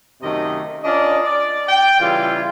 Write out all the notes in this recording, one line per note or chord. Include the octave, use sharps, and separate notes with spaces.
F#2 C3 D#3 A3 D#5
C#4 D4 F4 A#4 D5 D#5
D5
G5
C#3 E3 G3 E4 F4